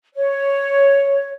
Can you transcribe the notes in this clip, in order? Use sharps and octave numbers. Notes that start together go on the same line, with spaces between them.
C#5